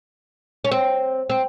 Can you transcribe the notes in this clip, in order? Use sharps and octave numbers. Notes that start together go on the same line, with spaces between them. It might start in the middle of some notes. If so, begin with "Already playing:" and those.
C#4
C4
C4